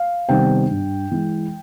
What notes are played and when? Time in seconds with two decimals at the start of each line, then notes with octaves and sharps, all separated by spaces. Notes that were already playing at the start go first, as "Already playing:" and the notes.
Already playing: F5
0.29 C3 D#3 G3 B3 G5
0.70 G2
1.11 E3 G#3